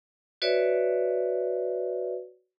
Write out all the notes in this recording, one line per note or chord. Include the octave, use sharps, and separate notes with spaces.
F#4 B4 C#5 D5 E5